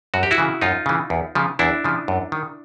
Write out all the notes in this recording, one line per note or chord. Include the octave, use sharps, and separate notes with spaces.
F#2 F#4
G4
E4 F#4
C#3 E3
F#2 D#4 F4
C#3 E3
E2
C#3 F3
E2 D4 E4
C#3 F3
F#2
D#3